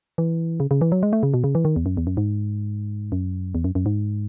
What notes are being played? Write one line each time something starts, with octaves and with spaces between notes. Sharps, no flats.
E3
C#3
C#3
E3
F#3
G#3
A3
C#3
B2
C#3
E3
D#3
E2
F#2
E2
F#2
G#2
F#2
E2
F#2
F#2
G#2